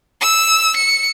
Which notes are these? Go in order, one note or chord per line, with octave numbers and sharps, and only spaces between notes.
E6
C#7